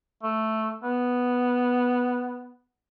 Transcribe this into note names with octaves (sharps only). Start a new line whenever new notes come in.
A3
B3